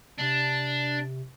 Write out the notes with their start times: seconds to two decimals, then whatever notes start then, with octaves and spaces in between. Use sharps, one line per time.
0.19 C3 D4